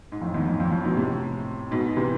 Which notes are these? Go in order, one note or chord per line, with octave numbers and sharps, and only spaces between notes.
G#2
F2 A2
E2 G#2
F2
F2
F2 A2
G#2 B2
A2 C3
G#2 B2
C3 E3